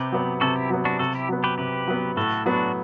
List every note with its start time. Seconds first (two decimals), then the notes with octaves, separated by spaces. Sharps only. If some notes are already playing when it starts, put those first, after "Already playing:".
Already playing: C3 G4 B4
0.12 F#3 B3
0.41 C3 F#4 A4
0.56 E4 G4
0.70 F#3 B3
0.85 D4 F#4
0.99 C3 F#4 A4
1.15 E4 G4
1.29 F#3 B3
1.44 G4 B4
1.58 C3 G4 B4
1.88 F#3 B3
2.17 A2 F#4 A4
2.46 F#3 B3 D4 F#4